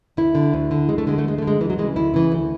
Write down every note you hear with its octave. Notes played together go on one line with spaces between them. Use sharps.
D2 E4
D3
D2
D3
D2 G#3
A3
D3 G#3
A3
D2 G#3
A3
D3
G#3
D2 E3
F#3
C#3 E3 G#3
D2 E4
C#3 E3
D2